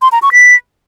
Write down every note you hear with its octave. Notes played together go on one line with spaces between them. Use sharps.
C6
A#5
C#6
B6